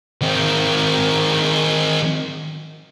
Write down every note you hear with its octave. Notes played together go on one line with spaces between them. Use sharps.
D#3 C4